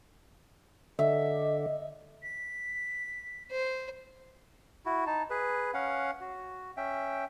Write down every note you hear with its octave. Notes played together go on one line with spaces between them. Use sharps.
D3 D#5 E5
B6
C5
E4 F#4
D#4 A5
G#4 B4
C#4 F5 F#5
F#4
C#4 E5 G5